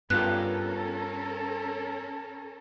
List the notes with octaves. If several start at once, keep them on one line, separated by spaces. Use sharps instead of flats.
G2 B3 C#4 F4 G4 A4 A#4 F#6